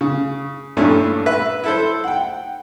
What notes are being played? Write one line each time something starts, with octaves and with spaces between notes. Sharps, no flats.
C#3
G2 A#2 A3 C#4 E4
B4 E5
E4 A4 C5
F#5 G5